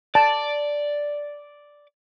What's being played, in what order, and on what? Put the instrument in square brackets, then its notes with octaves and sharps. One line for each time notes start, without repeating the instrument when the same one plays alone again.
[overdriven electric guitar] D5 [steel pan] A5